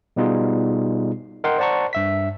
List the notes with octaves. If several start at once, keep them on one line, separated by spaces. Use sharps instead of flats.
B2 G3 B3 D#4 F4 G#4
A#4 D#5 F#5 G5 C6
C5 D5 F#5 A5 A#5 C#6
G2 E5 B6